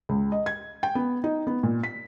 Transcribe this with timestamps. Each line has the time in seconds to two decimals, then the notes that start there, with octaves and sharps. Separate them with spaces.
0.09 C#2
0.32 D#5
0.46 G#6
0.83 G5
0.95 B3
1.24 D#4
1.47 B3
1.63 A#2
1.84 B6